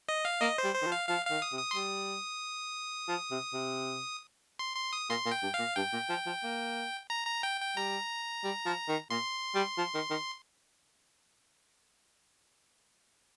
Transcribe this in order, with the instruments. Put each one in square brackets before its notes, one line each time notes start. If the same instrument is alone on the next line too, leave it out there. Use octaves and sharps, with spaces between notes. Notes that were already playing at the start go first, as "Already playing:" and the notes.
[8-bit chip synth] D#5
F5
[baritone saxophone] A#3 [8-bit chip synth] D#5
[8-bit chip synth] C5
[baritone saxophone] G3
[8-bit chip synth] C5
[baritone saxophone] D#3
F3
[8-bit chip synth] F5
[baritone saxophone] F3 [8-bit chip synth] F5
[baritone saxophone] D#3 [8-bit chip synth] F5
[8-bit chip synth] D#6
[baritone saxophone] C3
[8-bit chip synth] D#6
C6
[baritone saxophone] G3 [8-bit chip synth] D#6
[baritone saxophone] F3
C3
C3
[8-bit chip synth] C6
C6
D#6
[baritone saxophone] A#2 [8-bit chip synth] C6
[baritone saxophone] A#2
[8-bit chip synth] G5
[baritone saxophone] G2
[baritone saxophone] A#2 [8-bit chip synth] F5
[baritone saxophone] G2 [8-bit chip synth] G5
[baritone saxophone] A#2
F3
F3
A#3
[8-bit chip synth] A#5
A#5
G5
G5
[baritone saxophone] G3 [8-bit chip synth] A#5
[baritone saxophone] G3
F3
D#3
[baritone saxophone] A#2 [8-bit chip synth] C6
[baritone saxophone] G3
F3
D#3
D#3